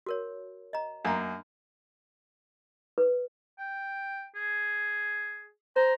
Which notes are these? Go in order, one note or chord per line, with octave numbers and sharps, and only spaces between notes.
F#4 A#4 C#5
D#5 A#5
F#2 A#3 D4 A#5
B4
G5
G#4
C5 A#5